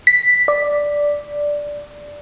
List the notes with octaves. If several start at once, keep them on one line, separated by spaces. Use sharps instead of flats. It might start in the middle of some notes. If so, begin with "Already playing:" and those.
B6
D5